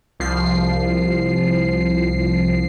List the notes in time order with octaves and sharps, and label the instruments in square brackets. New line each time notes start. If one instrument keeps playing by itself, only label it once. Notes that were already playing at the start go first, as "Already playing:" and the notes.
[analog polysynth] C2 F3 C7